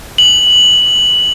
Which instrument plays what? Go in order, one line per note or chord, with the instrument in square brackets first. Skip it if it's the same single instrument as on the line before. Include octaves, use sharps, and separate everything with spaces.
[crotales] F#7